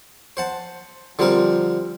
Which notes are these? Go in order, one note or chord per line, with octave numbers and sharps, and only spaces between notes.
C5 F#5 A5
D3 F3 G3 C4 A#4